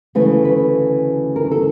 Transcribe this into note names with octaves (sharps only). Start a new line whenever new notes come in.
D2 C#3 E3 A3 B4
B4
A#4
A4